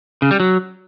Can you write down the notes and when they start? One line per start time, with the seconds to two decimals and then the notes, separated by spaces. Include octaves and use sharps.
0.22 C#3
0.31 G3
0.40 F#3